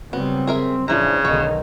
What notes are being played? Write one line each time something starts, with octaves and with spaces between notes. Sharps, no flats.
C#3 F#3 G3 B3 C4
G#4 A#4 E5
F#2 A2 C#3 E3 F3 D4 E4 A#5
B1 B2 D3 D#3 C#5 D#5